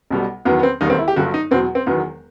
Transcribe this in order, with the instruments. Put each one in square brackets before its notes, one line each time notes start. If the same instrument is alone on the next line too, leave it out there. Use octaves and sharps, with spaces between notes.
[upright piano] B1 B2 G3
E2 D#3 F#3 B3
B3
C4
E1 D#2 D#3 G3 D#4
C4
E4
G4
G1 G2 F#3 F#4
D#4
E2 B2 F#3 C4
C4
E1 E2 D#3 F#3 B3